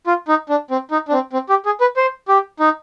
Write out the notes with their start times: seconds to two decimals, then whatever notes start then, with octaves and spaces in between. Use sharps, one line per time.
0.07 F4
0.28 D#4
0.49 D4
0.71 C4
0.91 D#4
1.08 D4
1.13 C4
1.33 C4
1.49 G4
1.66 G#4
1.81 B4
1.97 C5
2.28 G4
2.60 D#4